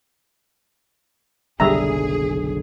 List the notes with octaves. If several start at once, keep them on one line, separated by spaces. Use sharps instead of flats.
F#1 B1 D3 G3 G#4 E5 A#5